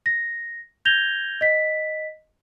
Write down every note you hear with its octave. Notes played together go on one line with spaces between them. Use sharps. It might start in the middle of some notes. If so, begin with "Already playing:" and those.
A#6
G6 G#6 A#6 F7 G7
D#5 B6